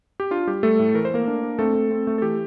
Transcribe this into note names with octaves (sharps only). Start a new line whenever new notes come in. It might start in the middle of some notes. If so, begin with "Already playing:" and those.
G4
D4 F4
G3 G4
G3 A3 A4
A2
E3 A#4
C5
A3 A#3 A#4
D4
D4
A3 C4 A4
A3
C4
A3
A4
E3 G4